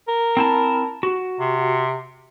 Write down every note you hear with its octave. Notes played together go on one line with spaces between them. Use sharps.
A#4
C4 E4 A5
F#4
C3